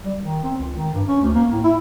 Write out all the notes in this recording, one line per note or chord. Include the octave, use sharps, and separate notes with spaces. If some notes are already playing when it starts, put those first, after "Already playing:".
G3
D#3
C4
C#2
D#3
G2
C#4
D2
A#3
A2
E4